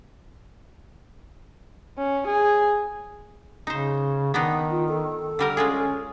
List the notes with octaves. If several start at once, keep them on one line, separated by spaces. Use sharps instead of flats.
C#4
G#4
C#3 D#4 C5
D#3 B3 D4 D#4
F4
A4
D3 G3 A#4
G#3 C#4 F4 G#4